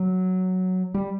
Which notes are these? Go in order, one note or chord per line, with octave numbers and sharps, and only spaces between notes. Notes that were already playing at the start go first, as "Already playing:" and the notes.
Already playing: F#3
G3